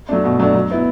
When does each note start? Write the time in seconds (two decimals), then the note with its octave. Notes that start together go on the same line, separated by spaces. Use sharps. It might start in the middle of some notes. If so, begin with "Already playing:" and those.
0.09 F#3 A3 D4
0.24 B2
0.40 F#3 A3 D4
0.55 F#3
0.71 B3 E4